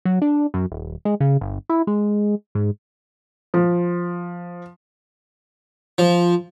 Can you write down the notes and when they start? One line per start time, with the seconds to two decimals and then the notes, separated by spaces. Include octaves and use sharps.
0.05 F#3
0.22 D4
0.54 F#2
0.70 D#1
1.05 G#3
1.20 C#3
1.41 G1
1.69 E4
1.87 G#3
2.55 G#2
3.54 F3
5.98 F3